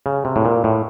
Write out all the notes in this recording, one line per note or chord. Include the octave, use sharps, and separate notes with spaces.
C#3
C3
A2
A#2
A2